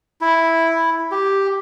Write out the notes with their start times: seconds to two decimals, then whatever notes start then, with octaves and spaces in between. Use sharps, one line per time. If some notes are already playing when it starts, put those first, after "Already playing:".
0.21 E4
1.11 G4